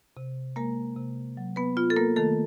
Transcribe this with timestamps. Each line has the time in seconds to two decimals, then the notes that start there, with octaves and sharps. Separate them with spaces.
0.17 C3
0.56 G#3 A#3 A#4
0.96 C3
1.37 F#3
1.56 B3 B4
1.77 B3 F4
1.90 A4
1.96 A#3 A#4
2.16 D#3 A3 A4